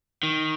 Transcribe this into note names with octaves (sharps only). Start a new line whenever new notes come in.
D#3